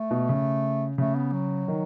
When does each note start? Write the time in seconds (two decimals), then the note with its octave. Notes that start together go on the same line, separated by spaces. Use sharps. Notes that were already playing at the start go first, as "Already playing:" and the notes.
Already playing: A3
0.11 B2
0.29 C#3
0.98 C#3 A3
1.15 B3
1.33 F#3
1.68 D#3